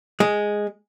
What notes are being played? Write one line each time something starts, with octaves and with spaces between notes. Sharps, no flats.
G#3